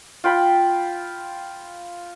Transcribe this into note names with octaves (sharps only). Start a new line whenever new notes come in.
F4 G5 B5